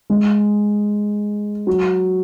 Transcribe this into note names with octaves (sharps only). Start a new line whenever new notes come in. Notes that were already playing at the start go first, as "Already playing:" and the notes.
G#3
F#3